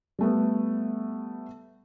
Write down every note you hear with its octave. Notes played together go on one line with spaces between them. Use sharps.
G3 A3 B3